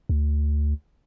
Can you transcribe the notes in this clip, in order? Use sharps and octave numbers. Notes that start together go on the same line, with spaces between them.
D2